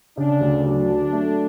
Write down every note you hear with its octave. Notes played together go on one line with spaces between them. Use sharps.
C#3 D4
D2
F#3 D4
F#3
A3